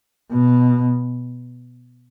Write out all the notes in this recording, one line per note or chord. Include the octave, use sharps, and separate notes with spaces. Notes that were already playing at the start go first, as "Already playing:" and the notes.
B2